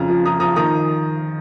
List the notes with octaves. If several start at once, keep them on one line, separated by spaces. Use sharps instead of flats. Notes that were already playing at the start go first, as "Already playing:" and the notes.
Already playing: F2 C#3 A#5
F3
F3 A#5 D#6
F3 A#5 D#6
D#3 A#5 D#6